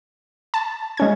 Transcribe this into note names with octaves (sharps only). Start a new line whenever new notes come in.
A5
G#3 C#4 G#6